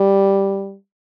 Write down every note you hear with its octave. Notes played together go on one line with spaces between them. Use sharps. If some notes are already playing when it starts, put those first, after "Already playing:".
Already playing: G3